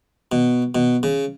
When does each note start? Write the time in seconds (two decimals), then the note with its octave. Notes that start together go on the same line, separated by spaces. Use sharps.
0.32 B2
0.75 B2
1.03 C#3